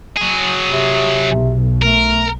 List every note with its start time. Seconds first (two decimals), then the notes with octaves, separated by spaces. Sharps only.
0.17 F#3 G#4
0.69 C3
1.31 B1
1.82 A3 A#4